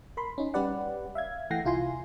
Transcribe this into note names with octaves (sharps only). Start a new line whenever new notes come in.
A#4 B5 C6
C#4 D#4
G3 C#4 G4 B4 D5 F#5
E5 F5 G#6
E3 A3 F#5 G5 A#6 C7
C2 E4 F4 G#5 C6